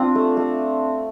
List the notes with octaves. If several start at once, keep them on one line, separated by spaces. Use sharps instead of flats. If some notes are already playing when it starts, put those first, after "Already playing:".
Already playing: C4 D4 F4
A3
A3